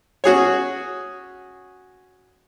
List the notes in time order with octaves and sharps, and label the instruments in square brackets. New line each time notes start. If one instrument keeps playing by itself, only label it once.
[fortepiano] C#4 F#4 G#4 C#5